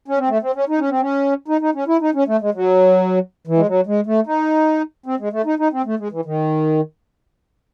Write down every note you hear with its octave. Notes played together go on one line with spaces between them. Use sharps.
C#4
C4
A3
C4
C#4
D#4
C#4
C4
C#4
D#4
D#4
C#4
E4
D#4
C#4
A3
G#3
F#3
E3
G#3
F#3
G#3
A3
D#4
C4
G#3
A3
D#4
D#4
C4
A3
G#3
E3
D#3